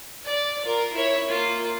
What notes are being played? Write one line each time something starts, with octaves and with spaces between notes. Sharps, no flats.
D5
F4 A#4
E4 C#5
A#3 F4